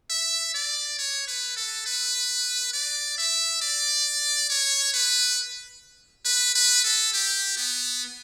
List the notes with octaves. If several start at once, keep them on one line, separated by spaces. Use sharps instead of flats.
E5
D5
C#5
B4
A4
B4
D5
E5
D5
C#5
B4
B4
B4
A4
G4
B3